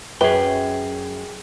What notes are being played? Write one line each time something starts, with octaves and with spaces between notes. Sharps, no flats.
F#2 G#4 B4 G5